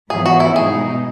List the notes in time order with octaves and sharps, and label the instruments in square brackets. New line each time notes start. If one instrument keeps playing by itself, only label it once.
[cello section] G#2 E3 B3 [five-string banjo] G#4
[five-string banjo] F#4
E4
[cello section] B2 G#3 D#4 [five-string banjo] G#4